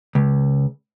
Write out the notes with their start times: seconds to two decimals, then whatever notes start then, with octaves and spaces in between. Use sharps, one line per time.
0.15 C#2